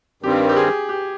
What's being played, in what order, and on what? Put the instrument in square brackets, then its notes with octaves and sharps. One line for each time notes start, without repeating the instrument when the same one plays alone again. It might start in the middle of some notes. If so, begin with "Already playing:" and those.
[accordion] G2 D#3 G3 C4 [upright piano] G4
[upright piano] G4
G#4
G4